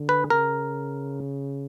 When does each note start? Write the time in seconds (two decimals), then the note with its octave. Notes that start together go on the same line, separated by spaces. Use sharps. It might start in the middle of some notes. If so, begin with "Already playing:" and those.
Already playing: D3
0.09 B4
0.30 C#3 A#4